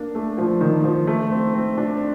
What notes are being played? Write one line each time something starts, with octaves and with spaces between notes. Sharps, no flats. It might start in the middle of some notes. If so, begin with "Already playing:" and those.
Already playing: A#3 D4
A3
F3
D#3
F3
A3
C4
C4
D4